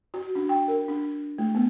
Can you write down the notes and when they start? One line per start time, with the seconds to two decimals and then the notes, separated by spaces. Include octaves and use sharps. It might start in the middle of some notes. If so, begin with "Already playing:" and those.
0.14 F#4
0.35 D4
0.49 G5
0.68 A#4
0.88 D4
1.38 A3
1.55 B3